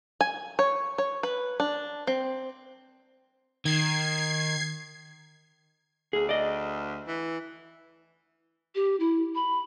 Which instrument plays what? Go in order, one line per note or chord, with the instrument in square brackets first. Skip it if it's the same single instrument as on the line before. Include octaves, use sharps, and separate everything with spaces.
[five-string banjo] G#5
C#5
C#5
B4
D4
C4
[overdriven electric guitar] D#3 [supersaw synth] G#6 C7
[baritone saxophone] D2 [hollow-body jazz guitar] G#4
[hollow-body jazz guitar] D5 D#5
[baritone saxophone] E3
[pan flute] G4
E4
B5